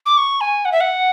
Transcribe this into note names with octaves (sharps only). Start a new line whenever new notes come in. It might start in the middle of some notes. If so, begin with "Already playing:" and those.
D6
C#6
G#5
F#5
E5
F#5